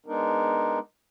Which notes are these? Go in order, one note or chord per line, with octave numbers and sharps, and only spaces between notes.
G#3 B3 D4 D#4 A#4